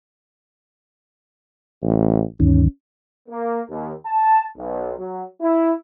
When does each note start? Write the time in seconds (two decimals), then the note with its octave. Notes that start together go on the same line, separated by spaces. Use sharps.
1.83 A1
2.40 D2 G2 D#3 C#4
3.29 A#3
3.70 D#2
4.06 A5
4.57 B1
4.98 F#3
5.41 E4